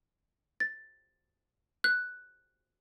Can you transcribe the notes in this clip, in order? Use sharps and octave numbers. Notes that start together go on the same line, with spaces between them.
A6
F#6